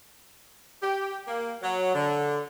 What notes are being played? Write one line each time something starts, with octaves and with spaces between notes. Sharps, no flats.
G4
A#3
F#3
D3